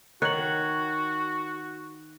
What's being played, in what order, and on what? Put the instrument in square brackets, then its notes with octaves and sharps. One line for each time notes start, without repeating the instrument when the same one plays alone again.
[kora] D#3 C#5 [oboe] F#4 [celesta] F#6 F#7